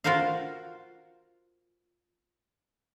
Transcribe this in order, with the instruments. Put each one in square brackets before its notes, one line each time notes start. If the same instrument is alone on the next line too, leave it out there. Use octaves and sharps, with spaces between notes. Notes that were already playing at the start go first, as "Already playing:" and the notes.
[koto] F4 F#4 A#4 C5 F5